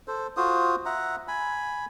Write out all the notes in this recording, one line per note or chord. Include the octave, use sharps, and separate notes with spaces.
A4 C5
F4 F#4 C5 D#6
E5 F#5 A#5
G#5 B5